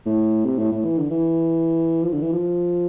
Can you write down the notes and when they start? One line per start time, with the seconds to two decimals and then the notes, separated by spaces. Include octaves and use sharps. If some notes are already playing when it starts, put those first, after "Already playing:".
0.06 A2
0.45 C3
0.58 A2
0.72 A2
0.85 E3
0.98 D3
1.11 E3
2.03 F3
2.12 D3
2.22 E3
2.33 F3